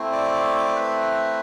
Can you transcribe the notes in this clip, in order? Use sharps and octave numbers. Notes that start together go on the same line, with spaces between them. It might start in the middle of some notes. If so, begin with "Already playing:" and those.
Already playing: A3 C4 E4
D5
B4